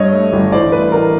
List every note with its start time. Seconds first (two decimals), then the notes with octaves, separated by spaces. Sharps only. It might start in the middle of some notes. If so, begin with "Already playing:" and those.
Already playing: G2 C#5 D#5
0.13 A3
0.33 G1
0.52 A1 C5 D5
0.72 A3 B4
0.92 A1 A#4